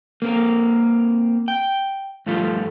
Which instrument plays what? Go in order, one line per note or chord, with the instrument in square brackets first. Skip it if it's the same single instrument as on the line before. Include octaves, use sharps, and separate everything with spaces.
[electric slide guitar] A#3 C4 A#4
G5
G2 F3 A3 F4